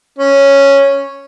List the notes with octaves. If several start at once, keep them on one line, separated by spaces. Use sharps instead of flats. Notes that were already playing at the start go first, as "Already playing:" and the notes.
C#4